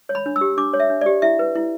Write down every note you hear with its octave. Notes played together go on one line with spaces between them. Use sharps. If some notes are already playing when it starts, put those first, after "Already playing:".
C#5
B5
D4
E6
G4
D4 D6
C#5
E5
D4
G4 D5
E4 E5
B4
E4